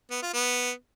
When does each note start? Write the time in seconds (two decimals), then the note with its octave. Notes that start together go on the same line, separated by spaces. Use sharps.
0.11 B3
0.22 F4
0.34 B3